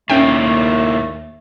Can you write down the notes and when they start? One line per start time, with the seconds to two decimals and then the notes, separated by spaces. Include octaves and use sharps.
0.10 D#2 A2 A3 A#3 C#4 G5